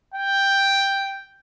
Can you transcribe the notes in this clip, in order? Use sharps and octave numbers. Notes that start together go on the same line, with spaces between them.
G5